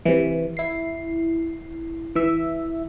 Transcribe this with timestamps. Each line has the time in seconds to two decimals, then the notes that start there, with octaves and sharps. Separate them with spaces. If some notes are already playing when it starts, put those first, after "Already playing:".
0.05 C3 E3
0.57 E4 C7
2.15 E3 E5